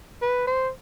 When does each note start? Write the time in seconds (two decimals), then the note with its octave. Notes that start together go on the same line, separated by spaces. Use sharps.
0.22 B4
0.47 C5